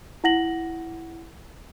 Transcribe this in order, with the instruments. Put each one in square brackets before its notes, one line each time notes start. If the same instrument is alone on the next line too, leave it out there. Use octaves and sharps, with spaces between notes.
[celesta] E4 F#5 A#6 F#7